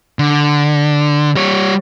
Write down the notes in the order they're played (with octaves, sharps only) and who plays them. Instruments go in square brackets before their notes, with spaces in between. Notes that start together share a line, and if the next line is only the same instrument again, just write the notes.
[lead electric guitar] D3
G3 C#5